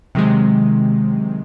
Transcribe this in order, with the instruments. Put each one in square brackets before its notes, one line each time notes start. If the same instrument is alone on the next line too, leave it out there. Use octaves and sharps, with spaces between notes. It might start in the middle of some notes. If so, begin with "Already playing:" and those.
[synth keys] C3 D#3 F#3 G#3